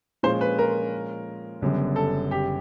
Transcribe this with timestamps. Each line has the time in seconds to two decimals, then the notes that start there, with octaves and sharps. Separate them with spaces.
0.23 A#2 F3 G#3 C#4 F4 C5
0.41 B4
0.59 A#4
1.61 F#1 F#2 D3 G3 B3
1.96 A4
2.31 G4